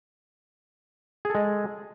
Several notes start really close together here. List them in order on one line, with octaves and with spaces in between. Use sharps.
G#4 A4 G#3